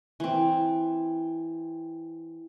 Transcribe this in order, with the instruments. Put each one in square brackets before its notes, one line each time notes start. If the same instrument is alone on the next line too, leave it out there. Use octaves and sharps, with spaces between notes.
[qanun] E3 C4